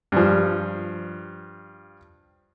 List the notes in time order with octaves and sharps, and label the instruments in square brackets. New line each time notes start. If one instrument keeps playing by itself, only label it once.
[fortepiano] G2 F3